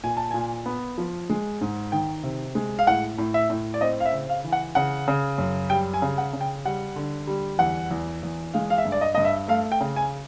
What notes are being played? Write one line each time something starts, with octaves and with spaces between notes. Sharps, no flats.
A#2 G#5
A5
A#2 G#5
B3
F3
G#3
G#2
D#3 G5
C3
G#3
F5
A2 F#5
A2
E5
A2
D5
C4 D#5
F5
E5
C#3
F5
E3
F#5
C#3 F#5
C#3
F#2
G3 G5
G#5
C#3
F#5
C#3
G5
G3 F#5
D3
G3
E2 F#5
E2
E2
G#3 F5
F5
E5
G2
D5
D#5
G2 D#5
E5
A3 F5
G5
C#3
G#5